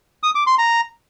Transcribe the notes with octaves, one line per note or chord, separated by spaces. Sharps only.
D#6
D6
C6
A#5